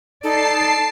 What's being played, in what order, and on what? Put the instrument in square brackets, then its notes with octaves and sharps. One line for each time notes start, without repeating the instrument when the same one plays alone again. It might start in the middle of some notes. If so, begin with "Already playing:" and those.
[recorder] D#4 [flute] A4 [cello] D5 [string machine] A5 C7